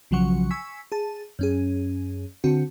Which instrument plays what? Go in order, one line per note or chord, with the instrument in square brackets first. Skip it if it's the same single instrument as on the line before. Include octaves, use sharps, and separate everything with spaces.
[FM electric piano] B1 C#3 F3 F#3 F#5 C#6
G#5 C#6 E6 B6
G#4 A5
F#2 C#4 G#4
D3 C4 F#4